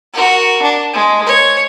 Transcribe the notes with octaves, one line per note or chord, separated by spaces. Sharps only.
F#4 A#4
D4
G#3
C#5